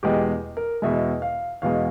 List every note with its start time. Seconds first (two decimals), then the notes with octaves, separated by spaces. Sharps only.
0.03 E2 B2 G#3 G4
0.57 A#4
0.82 E2 B2 G#3 E5
1.22 F5
1.62 E2 B2 G#3 F5